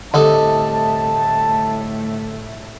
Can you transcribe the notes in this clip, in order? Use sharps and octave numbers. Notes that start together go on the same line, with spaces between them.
C2 A2 D3 A3 D#4 A4 A5